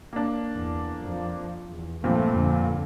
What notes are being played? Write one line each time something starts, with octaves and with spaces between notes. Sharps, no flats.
A#3 D4
E2
F2 F3
E2
G2 A#2 F3 A3 C4
F2 D3